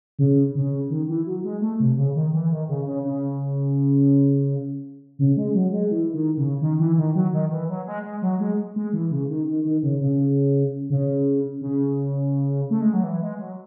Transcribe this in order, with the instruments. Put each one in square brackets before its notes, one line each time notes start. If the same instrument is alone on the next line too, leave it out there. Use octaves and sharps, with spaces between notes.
[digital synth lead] C#3
C#3
D#3
E3
F#3
G#3
A3
C3
C#3
D#3
E3
D#3
C#3
C#3
C#3
C#3
G#3
F#3
G#3
E3
D#3
C#3
D#3
E3
D#3
F#3
D#3
E3
F#3
G#3
G#3
F#3
G#3
G#3
E3
C#3
D#3
D#3
D#3
C#3
C#3
C#3
C#3
A3
G#3
F#3
E3
G#3
F#3